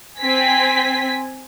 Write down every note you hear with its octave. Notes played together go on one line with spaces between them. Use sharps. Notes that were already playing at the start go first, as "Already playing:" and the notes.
C4 G#5 B6